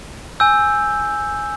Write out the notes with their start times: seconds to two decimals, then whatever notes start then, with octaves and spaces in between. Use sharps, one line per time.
0.40 G#5 E6 G6